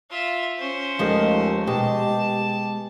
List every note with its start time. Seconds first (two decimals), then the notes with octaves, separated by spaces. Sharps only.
0.10 F4 E5
0.58 C#4 C5
0.99 D#2 F3 G#3 A3
1.67 B2 G#3 G4 A5